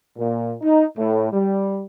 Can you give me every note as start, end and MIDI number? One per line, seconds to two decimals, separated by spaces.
0.17 0.53 46
0.62 0.84 63
0.97 1.27 45
1.32 1.82 55